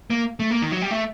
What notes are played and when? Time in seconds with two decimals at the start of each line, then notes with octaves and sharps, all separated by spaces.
0.10 A#3
0.40 A3
0.51 A#3
0.62 D#3
0.72 F#3
0.81 G3
0.91 A3